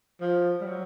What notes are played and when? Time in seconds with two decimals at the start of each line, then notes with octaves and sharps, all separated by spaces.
0.21 F3
0.61 G3
0.66 F#3